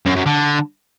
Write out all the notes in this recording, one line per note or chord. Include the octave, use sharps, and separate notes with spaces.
F#2
F#2
D3